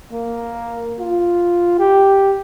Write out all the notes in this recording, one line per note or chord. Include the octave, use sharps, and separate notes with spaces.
A#3
F4
G4